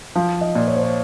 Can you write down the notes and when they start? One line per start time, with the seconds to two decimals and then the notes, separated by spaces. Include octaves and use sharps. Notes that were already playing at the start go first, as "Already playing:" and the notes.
0.15 F3 F5
0.41 D#5
0.55 A#2
0.68 C#5
0.76 C5
0.83 C#5